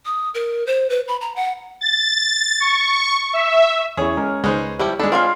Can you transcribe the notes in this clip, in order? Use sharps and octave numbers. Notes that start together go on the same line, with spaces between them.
D#6
A#4
C5
B4
B5
A#5
F#5
A6
C#6
E5
E2 C#4 E4 G#4 C#5
G#3 C#4 A#4
C#2 G#3 C#4 D#4 B4 C5
F3 G3 E4 G4
G#3 D4 A4 B5
C4 F4 C5 D#5 F5 G#5